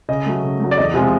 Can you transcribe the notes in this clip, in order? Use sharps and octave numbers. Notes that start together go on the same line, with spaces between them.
C#3 D#5
F#3 A3
C#3
F#3 A3
D5
E2 D#5
C3 F3 G#3